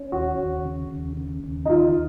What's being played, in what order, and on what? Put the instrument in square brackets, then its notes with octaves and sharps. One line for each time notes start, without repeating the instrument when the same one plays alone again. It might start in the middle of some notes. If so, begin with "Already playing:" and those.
Already playing: [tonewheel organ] C#4
[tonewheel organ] D#2 [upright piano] F#4
[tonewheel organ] D#2
C#3
D#2
C#3
D#2
[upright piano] D#4
[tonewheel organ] D#3 [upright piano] F4